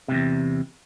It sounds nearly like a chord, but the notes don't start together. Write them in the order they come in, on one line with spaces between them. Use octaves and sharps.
C3 G#2 E2